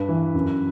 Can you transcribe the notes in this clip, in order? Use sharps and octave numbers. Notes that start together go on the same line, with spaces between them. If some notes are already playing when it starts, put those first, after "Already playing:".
Already playing: G2 B4
E3
F#2